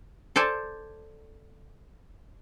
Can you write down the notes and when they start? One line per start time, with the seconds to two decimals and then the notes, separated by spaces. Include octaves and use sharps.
0.36 A4 C5 D5 G#5 A5